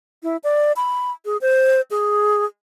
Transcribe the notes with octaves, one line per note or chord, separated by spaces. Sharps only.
E4
D5
B5
G#4
C5
G#4